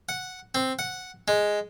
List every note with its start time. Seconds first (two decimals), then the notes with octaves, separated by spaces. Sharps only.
0.09 F#5
0.55 C4
0.79 F#5
1.28 G#3